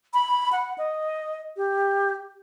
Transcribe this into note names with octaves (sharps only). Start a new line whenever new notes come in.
B5
F#5
D#5
G4